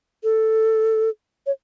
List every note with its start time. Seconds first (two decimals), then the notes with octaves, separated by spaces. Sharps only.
0.24 A4
1.46 C#5